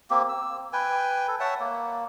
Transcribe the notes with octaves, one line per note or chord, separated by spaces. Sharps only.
A#3 C4 G4
E6
B4 G5 G#5
A4
C#5 E5 F#5 A5
A#3